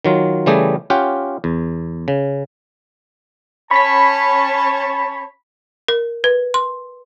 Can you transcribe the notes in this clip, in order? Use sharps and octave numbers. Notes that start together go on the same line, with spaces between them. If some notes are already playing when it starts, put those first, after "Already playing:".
D#3 F#3 F4
C#3 E3 G3 A3 G4 G#4
C#4 F4 G4 F#5 G5
E2
C#3
C#4 C#5 A5 B5 B6
A#4
B4
C6